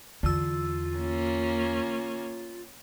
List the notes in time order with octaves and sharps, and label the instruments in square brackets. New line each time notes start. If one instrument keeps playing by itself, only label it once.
[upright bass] E2 [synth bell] D3 E6 [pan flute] F4
[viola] A#3 C#4